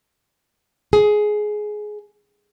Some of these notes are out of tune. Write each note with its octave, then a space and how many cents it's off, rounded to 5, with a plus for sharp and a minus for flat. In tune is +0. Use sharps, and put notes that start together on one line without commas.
G#4 +15